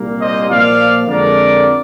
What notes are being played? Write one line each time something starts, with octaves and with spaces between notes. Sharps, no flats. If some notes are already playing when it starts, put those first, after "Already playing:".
Already playing: C2 A#2 G3 A#3
C5 D#5
A#2 F3 A#3 D5 F5
F2 D3 G#3 A#4 D5